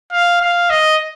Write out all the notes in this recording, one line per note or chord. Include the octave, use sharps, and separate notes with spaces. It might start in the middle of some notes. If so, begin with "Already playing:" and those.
F5
F5
D#5